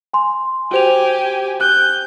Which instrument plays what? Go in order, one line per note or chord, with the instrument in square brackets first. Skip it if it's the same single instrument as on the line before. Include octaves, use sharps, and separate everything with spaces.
[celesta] G#5 C6
[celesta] F#4 C5 F7 [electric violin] G4 G#5
[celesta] F#6 [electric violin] G6